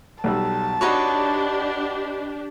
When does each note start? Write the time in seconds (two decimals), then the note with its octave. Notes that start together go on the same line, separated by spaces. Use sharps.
0.24 B1 G3 A5 E6
0.81 D4 D#4 F#4 G4 B4 C#5